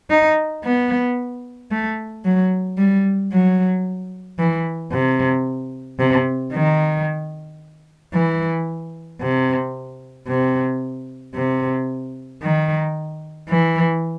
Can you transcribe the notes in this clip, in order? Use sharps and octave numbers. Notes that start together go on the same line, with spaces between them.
D#4
B3
A3
F#3
G3
F#3
E3
C3
C3
D#3
E3
C3
C3
C3
D#3
E3